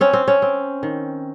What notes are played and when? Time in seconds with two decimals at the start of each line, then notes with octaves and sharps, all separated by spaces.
0.01 C4 C#4
0.13 C4
0.28 C#4
0.42 C4
0.83 D#3